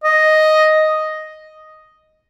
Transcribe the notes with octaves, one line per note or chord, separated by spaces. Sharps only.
D#5